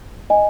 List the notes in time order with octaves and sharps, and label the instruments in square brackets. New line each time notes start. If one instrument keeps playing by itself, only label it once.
[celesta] D#5 G#5